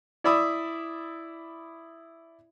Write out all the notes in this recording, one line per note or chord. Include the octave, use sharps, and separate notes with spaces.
E4 D5 E5 B5 D#6